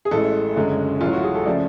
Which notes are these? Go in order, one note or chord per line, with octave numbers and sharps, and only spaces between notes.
G#4
A1 A2 G#3 A4
F#1 F#2 D3 G#3
A1 A2 F#3 F4
F#4
G#4
A4
C#3 F3 A3 D5